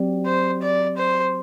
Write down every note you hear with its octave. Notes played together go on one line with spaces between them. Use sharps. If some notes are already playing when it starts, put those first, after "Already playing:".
Already playing: F#3 C4 G4 D5
C5
D5
C5